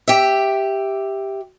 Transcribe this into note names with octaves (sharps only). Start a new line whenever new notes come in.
G4 E5